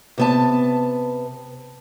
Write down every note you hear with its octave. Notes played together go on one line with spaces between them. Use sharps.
C3 B3 A5